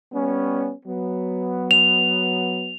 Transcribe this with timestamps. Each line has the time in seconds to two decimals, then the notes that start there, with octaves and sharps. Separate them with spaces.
0.13 G3 B3 C#4
0.85 F#3 B3
1.71 F7